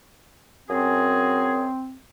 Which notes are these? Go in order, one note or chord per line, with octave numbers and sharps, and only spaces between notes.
F#2 C4 G#4